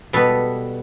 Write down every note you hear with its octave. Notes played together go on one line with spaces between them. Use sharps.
B2 G3 B3 A4 B4